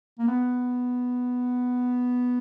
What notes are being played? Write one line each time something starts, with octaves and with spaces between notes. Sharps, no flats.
A#3
B3